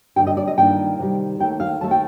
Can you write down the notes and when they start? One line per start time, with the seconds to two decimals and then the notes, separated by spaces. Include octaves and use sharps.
0.16 G2 D3 A3 G5
0.27 D#5
0.37 D5
0.47 D#5
0.57 G2 D#3 A#3 D4 F4 G5
0.99 C3 D#3 G3
1.40 D#2 D#3 A3 G5
1.60 F5
1.81 D#2 D#3 A3 A5
1.91 G5